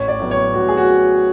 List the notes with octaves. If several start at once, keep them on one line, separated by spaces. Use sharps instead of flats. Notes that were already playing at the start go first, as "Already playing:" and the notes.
Already playing: A1 C#5
D5
A2 F#3 B3
C#5
A1 F#4
G#4
F#4